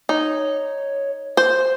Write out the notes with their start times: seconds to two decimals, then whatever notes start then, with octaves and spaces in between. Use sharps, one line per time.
0.09 D#4 C#5
1.37 C5